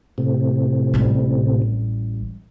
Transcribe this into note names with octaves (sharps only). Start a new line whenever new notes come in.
A2 C3
A1 G3